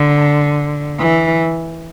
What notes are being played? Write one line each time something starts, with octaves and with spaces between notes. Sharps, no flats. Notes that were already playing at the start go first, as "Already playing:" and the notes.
Already playing: D3
E3